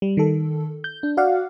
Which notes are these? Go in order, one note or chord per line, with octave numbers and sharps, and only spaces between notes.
G3
D#3 A4
G6
D4
F#4 D5 F5 F#5